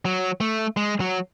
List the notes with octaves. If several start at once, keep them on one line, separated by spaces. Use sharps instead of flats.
F#3
A3
G#3
F#3